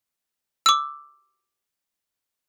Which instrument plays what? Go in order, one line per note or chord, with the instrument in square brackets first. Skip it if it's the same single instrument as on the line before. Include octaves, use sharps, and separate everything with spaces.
[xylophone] D6 E6